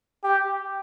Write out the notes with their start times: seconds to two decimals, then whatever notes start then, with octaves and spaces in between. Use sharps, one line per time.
0.24 G4